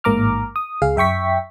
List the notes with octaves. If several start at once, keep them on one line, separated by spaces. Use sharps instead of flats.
A1 G#2 A#3 A#5 D6 F6
D#6
C#2 G#4 F5
F#2 E5 G5 C#6 B6